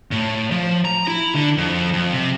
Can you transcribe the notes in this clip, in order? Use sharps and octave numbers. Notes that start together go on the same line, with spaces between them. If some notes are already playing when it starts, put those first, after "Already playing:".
A2
F3
A#5
E4
D3
F2
F2
C3